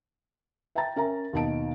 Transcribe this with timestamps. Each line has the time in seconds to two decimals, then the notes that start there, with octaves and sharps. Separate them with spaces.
0.75 E5 G5 A5 A#5 A6
0.96 C#4 A#4 E5 A#5
1.33 D#2 B2 D#4 A5 D7